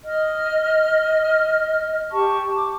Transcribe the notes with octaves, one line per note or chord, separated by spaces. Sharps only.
D#5 F6
G4 A5 C#6
D6